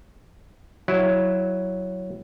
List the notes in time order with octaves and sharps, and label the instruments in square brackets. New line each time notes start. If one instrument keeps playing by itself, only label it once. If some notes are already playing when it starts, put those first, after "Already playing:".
[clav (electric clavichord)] F#3 E4